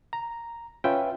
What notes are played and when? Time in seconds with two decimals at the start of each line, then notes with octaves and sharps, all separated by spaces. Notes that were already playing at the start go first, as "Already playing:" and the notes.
0.13 A#5
0.84 C#4 F4 B4 E5 G5